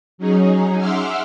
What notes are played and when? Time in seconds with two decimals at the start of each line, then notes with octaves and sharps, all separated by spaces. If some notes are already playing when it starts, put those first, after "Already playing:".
0.18 F#3 C#4 D#4 G#4
0.78 E5 F#5 C6 D6 E6 F6